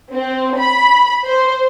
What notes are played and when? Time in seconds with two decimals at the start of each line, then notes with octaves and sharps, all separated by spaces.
0.12 C4
0.60 B5
1.27 C5